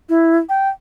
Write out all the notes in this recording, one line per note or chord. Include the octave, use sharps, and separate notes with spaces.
E4
G5